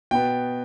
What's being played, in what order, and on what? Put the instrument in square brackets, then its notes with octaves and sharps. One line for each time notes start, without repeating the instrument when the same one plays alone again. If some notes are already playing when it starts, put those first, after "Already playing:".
[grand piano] B2 B3 G5